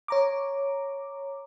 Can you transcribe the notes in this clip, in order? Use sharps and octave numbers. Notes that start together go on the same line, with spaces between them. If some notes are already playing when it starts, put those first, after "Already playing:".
C#5 A#5 D6